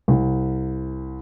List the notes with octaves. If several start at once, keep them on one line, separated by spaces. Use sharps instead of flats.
C2